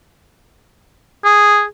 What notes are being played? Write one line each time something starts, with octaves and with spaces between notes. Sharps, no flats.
G#4